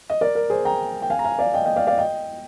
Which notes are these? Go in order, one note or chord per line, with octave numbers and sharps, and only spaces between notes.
D#5
A#4 D5
A#4
G#4 C5
G5 A#5
G5
F5 G#5
A#5
F5 G#5
D5 F5
D#5 G5
D#5 G5
D5 F5
D5 F5
D#5 G5